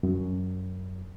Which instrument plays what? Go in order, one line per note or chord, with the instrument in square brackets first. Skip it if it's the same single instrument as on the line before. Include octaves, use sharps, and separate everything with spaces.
[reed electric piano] F#2